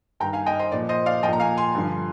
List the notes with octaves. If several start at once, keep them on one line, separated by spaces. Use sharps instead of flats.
G2 D#3 G5 A#5
F5 G#5
D#5 G5
C5 D#5
A#2 F3 D5
C5 D#5
D5 F5
A#2 F3 D#5 G5
A#5
F5 G#5
G#5 C6
G2 D3 F3